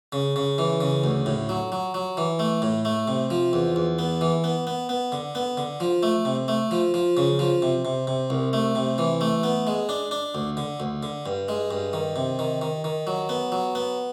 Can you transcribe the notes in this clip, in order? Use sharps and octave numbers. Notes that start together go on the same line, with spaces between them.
C#3
C#3
E3
C#3
D2
A2
F#3
F#3
F#3
E3
A3
A2
A3
C3
F3
E2
E2
B3
E3
B3
B3
B3
D3
B3
D3
F3
A3
C3
A3
F3
F3
C#3
F3
C3
C3
C3
C2
A3
C3
E3
A3
B3
G#3
D4
D4
D2
D3
D2
D3
G2
G#3
G2
D#3
C3
D#3
D#3
D#3
F#3
B3
F#3
B3